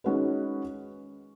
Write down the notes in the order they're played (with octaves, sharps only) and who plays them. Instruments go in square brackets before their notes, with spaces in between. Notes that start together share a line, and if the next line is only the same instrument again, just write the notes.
[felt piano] D#3 G#3 C#4 F#4 B4